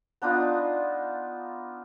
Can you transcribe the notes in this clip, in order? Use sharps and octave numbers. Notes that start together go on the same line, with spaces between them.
B3 D4 D#4 F4